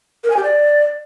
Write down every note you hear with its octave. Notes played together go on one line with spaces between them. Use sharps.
A#4
G#5
G4
D5